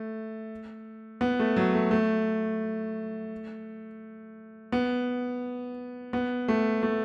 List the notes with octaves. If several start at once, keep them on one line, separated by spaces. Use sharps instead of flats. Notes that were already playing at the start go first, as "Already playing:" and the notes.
Already playing: A3
B3
A3
F#3
A3
A3
B3
B3
A3
A3